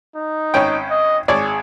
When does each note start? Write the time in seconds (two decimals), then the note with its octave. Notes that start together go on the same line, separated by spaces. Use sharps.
0.15 D#4
0.54 G#1 C#4 G5
0.90 D#5
1.28 G#1 G#4 C#5 D5